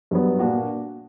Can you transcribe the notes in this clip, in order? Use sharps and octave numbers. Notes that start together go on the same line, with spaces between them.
G2 F#3 B3
A#2 A#3 D4 F#4